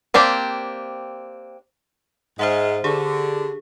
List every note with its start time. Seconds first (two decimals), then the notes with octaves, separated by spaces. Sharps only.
0.14 A#3 C4 D4 G4
2.39 G#2 G#3 C5 E5 F#5
2.84 D3 G4 G#4